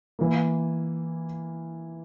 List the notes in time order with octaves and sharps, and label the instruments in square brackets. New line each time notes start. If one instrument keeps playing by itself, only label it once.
[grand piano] E3 A#3